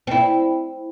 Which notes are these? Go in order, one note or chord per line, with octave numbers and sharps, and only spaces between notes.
C4 E4